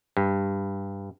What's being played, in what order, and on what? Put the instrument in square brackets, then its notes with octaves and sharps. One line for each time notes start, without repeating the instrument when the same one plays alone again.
[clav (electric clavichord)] G2